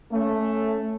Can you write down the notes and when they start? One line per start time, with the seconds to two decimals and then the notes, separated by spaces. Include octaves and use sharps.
0.11 A3 C#4